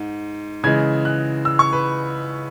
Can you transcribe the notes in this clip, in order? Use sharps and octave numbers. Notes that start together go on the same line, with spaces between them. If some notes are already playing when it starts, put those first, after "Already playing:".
Already playing: G#2
C#3 E3 G#3 G#6
F#6
E6
C#6
B4